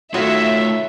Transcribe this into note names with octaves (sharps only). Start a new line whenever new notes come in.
D#3 A3 F4 F#4 B4 C#5 E5